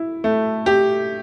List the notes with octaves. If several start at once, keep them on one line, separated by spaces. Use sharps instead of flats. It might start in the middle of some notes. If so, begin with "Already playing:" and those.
Already playing: E4
A3
G4